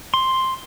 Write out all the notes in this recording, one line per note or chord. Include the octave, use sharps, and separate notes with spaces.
C6